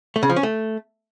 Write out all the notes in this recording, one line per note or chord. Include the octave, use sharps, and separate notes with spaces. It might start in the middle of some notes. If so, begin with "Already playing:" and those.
A3
C#3
F3
C#4
A3